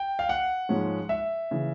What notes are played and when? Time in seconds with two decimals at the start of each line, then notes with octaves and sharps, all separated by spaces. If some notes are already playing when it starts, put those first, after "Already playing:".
Already playing: G5
0.19 F5
0.29 F#5
0.69 G#2 F3 G#3 C#4
1.09 E5
1.51 C#3 E3